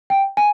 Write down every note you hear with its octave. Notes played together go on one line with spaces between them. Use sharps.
G5
G#5